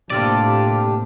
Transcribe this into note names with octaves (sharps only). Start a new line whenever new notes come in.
A2 C3 A#3 D4 F4 G4 A4 D5